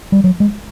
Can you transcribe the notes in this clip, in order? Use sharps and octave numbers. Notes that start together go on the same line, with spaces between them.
G3
F#3
G#3